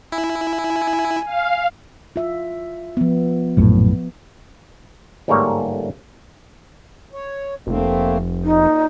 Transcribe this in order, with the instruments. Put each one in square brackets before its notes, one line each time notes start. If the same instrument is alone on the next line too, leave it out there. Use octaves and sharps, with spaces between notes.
[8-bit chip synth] E4 [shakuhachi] G#5
[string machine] F5
[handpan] F4 E5
F3 B3
[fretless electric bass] A#1 F#2 A2
[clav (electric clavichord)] G1 G#2 G3 A3 A#3 C#5
[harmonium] C#5
[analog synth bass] F1 [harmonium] A3 A#3 C4
[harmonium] A#2 [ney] D#4